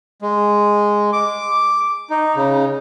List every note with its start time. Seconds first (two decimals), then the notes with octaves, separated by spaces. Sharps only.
0.22 G#3
1.13 D6
2.10 D#4
2.36 C#3